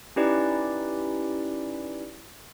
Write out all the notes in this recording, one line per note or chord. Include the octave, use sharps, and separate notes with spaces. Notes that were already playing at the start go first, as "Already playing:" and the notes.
C#4 D#4 E4 G4 B4 D5